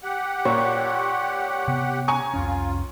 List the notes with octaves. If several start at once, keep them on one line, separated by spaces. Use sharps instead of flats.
G4 F#5
A#2 C#5
C3 B3
G#5 A#5 C#6
C2 F2 C#4 F4